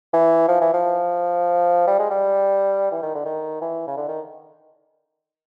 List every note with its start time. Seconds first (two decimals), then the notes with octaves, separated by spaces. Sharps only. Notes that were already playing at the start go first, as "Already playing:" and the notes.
0.13 E3
0.48 F3
0.61 E3
0.73 F3
1.87 G3
1.99 G#3
2.11 G3
2.91 E3
3.02 D#3
3.15 D3
3.25 D#3
3.61 E3
3.87 C#3
3.97 D3
4.08 D#3